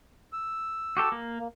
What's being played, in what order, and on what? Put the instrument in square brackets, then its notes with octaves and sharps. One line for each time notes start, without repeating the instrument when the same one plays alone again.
[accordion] E6
[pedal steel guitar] F#4 G4 A4
A#3
[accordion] A#3